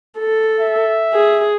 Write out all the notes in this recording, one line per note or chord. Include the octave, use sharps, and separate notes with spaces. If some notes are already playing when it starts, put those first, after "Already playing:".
A4
E5
G#4